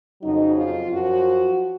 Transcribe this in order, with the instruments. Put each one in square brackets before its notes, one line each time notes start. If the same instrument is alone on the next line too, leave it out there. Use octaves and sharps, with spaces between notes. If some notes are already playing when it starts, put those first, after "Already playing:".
[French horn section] F2 C#3 F#3 D#4
F4
F#2 F3 F#4